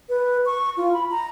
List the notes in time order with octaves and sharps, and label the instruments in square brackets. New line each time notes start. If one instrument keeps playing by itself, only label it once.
[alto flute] B4
C#6
F4
B5
A#5